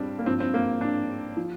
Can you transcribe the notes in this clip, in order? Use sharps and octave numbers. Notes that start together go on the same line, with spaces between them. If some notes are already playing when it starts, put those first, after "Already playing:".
Already playing: G2 G3 C4 D4
A#3
G2 F3 C4
C4
A#3
D4
F3